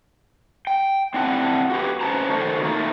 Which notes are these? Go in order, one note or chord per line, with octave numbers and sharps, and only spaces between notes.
G5
C4 D4 E4 F#5 A5
F#4 G4 B4
C#4 B4 C5 A5 A#5
D#3 D4 F#4 A4 C5
A3 A#3 D#4 F#4 A#4